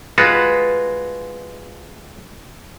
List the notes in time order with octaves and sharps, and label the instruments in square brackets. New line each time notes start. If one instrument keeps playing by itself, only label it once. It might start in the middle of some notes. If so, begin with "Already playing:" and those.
[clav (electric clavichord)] G#3 F4 F#4 [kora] B4